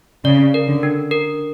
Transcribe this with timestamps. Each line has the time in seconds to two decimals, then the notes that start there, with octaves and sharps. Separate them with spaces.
0.25 C#3 D5
0.54 A#4
0.68 D3
0.83 D4
1.11 A#4